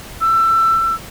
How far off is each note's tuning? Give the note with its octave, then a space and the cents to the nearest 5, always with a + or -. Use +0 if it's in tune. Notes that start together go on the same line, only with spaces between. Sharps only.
E6 +25